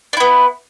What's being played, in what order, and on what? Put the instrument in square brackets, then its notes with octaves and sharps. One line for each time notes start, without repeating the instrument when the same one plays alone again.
[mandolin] D4
E4
B3